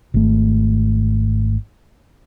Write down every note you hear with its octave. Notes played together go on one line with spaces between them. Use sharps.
G#1 A3